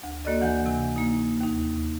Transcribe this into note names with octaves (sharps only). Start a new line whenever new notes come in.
D2
A#3 F#4 A4 D5 D#5
D2 E3 F#5 G#5 G6
C3 G#5
A#3 D#4
D#2 D#4